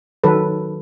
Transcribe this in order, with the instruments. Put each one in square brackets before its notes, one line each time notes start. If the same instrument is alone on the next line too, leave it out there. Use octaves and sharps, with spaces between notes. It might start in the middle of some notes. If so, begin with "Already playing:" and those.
[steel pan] D#3 F#3 A4 B4